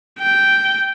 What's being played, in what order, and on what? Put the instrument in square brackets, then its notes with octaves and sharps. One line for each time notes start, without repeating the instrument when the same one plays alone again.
[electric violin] G5